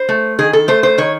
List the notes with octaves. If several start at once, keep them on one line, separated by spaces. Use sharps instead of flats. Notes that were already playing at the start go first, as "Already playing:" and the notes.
Already playing: C5
A3
D#3 G#4
A4
A3 C5
C5
D#3 C#5